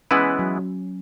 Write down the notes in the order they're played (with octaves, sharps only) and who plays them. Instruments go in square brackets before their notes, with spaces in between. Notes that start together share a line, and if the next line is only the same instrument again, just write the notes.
[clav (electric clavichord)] E3 G#3 B3 E4 B4 [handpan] C#4
[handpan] F#3